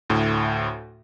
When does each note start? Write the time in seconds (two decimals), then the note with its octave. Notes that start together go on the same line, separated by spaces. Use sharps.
0.10 D2 A2